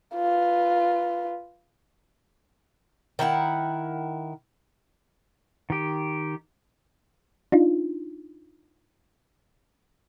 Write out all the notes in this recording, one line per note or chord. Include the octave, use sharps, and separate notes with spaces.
F4 B4
D#3 E4 A#4 F#5
D#3 G4
D4 D#4 F4